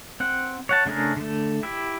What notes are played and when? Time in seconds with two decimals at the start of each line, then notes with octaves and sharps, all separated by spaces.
0.20 C4 F#5
0.69 C#5 F#5 A5
0.85 C#3 A3 D4 G#4 A#4
1.16 D3 A3
1.63 E4 G4 E5